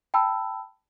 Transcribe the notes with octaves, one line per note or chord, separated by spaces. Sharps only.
G5 A5 B5 E6